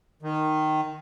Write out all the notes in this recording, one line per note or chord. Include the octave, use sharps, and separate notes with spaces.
D#3